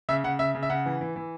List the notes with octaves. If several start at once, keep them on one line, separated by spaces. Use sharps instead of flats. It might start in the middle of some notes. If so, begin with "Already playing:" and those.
C#3 E5
C#3 F#5
C#3 E5
C#3
E5
C#3 F#5
E3
E3
E3